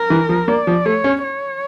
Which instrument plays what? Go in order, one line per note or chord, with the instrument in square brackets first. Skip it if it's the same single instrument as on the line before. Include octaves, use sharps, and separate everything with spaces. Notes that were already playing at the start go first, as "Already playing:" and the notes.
Already playing: [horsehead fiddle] A#4
[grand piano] E3
F3
[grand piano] A#3 [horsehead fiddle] D5
[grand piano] F3
[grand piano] A3 [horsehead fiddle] C#5
[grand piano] C#4
[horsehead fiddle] C#5